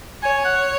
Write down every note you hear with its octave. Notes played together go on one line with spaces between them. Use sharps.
C#5 G#5
G#5
F#5